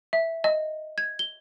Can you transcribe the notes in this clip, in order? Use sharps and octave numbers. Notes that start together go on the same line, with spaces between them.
E5
D#5
G#6
G7